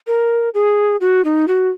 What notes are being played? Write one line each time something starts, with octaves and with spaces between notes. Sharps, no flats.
A#4
G#4
F#4
D#4
F#4